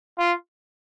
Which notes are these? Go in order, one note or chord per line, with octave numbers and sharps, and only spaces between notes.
F4